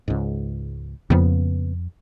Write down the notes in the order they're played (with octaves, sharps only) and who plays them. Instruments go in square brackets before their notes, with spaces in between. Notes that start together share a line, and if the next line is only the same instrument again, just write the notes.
[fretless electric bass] C#2 G#2
[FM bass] F2 [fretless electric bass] C#3 A#3 B3